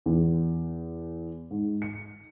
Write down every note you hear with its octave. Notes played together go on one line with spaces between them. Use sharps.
E2
G#2
C#7